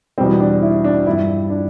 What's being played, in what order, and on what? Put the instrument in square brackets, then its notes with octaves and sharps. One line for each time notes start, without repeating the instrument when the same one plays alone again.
[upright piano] E2 B2 G3 C4
D4
E4
D4
G2 F3 E4
D4